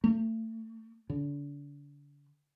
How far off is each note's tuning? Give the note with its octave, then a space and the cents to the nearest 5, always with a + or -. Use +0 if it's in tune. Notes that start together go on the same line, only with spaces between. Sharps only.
A3 +30
D3 -35